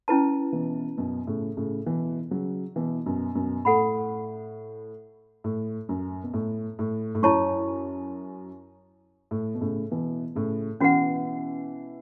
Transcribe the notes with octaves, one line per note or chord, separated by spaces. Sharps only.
C#4 E4 B4 A5
B2 E3
F#2 B2
A2 C#3
A2 C#3
B2 E3
C#3 F#3
B2 E3
F#2 B2
F#2 B2
A2 A4 F#5 B5
A2
F#2
B2
A2
A2
A2
F#2 E4 C#5 A5 C#6
A2
B2
A2 C#3
B2 E3
A2 C#3
B2 E3 C#4 F#4 B4 F#5